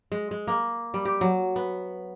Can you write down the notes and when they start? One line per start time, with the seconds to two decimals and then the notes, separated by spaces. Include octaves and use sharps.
0.12 G#3
0.31 G#3
0.47 A#3
0.94 G3
1.05 G4
1.21 F#3
1.56 B3